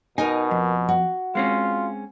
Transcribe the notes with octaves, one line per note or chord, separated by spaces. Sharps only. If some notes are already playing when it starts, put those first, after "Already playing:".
B2 D#4 A#4 D#5 G#5
F2
F#4
G#3 C4 C#4 F4